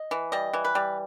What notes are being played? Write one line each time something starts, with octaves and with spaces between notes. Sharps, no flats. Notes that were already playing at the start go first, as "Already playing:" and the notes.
Already playing: D#5
E3
G3 D#5
E3
B4
G3